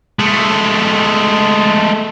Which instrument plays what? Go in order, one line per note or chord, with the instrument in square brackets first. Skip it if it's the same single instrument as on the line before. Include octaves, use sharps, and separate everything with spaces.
[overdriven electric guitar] G#3 A3